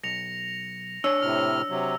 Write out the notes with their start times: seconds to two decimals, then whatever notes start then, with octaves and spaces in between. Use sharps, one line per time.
0.04 B1 A#6 C#7 F7
1.04 D4 C#5 E6
1.21 A2 C3 F6
1.70 C3 F#3